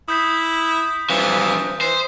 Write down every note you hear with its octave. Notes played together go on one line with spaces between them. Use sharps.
E4 D#6 G6 B6
G2 E3 F3
E3 C5